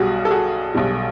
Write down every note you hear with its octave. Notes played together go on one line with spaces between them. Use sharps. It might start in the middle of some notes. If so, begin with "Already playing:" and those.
Already playing: B1 B2 G3 F#4 G#4
A4
F#4 G#4
B1 B2 G3